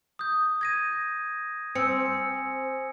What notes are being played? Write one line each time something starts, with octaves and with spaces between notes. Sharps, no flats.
D#6 G6
G#6 A#6 D#7
C4 G#5 E6 C#7